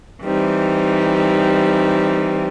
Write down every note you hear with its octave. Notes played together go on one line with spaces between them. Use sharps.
E3 G3 C4 D#4